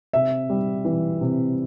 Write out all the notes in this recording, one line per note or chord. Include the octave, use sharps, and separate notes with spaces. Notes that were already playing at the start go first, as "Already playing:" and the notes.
C3 E5
G3
E3
C3